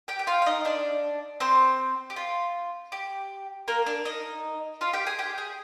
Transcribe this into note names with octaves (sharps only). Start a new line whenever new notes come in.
G4 G5
G5
F4 F5
F5
D#4 D#5
D4 D5
C4 C5
G4
F4
G4
A#3 A#4
D4 D5
D#4 D#5
F4 F5
G4 G5
G#4 G#5
G4 G5
G#4